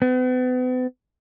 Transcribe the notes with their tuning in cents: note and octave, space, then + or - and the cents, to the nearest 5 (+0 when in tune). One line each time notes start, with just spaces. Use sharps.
B3 +40